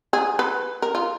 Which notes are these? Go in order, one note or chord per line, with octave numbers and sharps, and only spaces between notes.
G#4
B4
A#4
F4